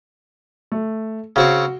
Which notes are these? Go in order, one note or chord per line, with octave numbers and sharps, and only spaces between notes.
A3
C#3 C4 F#4 C#5